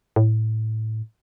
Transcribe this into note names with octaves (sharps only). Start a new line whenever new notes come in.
A2